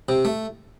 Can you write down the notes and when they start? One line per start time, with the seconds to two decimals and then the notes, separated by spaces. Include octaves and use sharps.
0.09 C3
0.25 A3